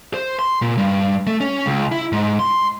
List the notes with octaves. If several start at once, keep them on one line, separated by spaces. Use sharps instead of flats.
C5
C6
A#2
G2
A3
C#4
C#2
E4
G#2
C6